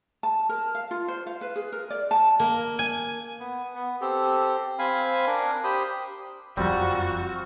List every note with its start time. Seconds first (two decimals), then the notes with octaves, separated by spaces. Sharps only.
0.23 A5
0.49 A#4
0.75 F5
0.91 F4
1.08 C5
1.27 F5
1.41 B4
1.56 G#4
1.72 A#4
1.90 D5
2.11 A5
2.40 A#3
2.79 G#5
3.40 B3
3.74 B3
4.01 C4 G4 A4
4.79 C4 F5 G#5 B5
5.27 D4 A#4
5.64 G4 C5 B5 D#6
6.57 F#1 F2 F3 G3 C4 F4 F#4 A#4